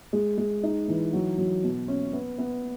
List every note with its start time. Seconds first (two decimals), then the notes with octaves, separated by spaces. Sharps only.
0.13 G#3
0.38 G#3
0.63 D#4
0.88 E3
1.13 F#3
1.38 F#3
1.64 B2
1.88 C#4
2.13 B3
2.38 B3